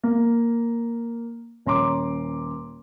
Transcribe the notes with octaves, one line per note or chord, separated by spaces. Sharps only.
A#3
D#1 C#4 A#5 C6 D6